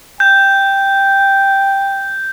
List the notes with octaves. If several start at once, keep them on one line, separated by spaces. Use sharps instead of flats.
G5 G6